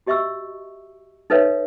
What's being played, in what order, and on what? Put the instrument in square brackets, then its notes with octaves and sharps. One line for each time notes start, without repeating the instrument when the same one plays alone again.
[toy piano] F#4 G4 D#5 E5 C#6 E6
D#4 A4 B4 C#5 E5 F5